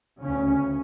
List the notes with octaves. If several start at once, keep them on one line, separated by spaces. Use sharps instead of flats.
D2 C#3 C#4